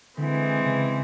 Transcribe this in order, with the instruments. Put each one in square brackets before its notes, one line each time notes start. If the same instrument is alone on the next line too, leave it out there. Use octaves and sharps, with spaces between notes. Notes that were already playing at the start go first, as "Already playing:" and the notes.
[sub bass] D3 [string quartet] E3 G#3 C4
[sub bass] C#3